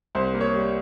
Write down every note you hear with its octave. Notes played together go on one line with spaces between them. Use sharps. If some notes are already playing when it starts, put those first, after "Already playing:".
C2 C5
A#3
C#5
G3